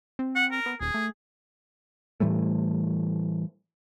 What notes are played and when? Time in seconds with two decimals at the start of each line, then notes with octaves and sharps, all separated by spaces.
0.19 C4
0.35 F#5
0.51 A#4
0.66 B3
0.80 D#1 G#4
0.94 A3
2.20 A2 E3 G3 A3